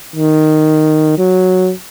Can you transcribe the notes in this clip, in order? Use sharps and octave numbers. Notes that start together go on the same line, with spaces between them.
D#3
F#3